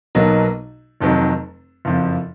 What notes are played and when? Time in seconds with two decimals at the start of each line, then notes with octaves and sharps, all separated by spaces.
0.15 B1 B2 F#3 A#3 D#4
1.00 F1 F2 D#3 F#3
1.85 F#1 F2 F3